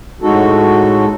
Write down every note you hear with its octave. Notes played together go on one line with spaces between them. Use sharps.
A2 G#3 D#4 F#4 A4